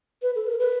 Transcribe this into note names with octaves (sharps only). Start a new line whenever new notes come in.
B4
A4
A#4
B4